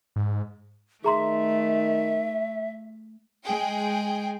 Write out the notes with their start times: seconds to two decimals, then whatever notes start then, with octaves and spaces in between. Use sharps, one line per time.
0.16 G#2
1.04 D#3 A3 G#4 E5 A#5 C6
3.44 G#3 G#4 G5